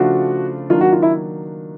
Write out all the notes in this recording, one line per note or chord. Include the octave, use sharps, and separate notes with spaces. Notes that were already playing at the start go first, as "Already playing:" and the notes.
Already playing: C#3 F3 A3 D4 F4 F#4
D#3 F#3 A#3 D4 F4
F#4
F4
E4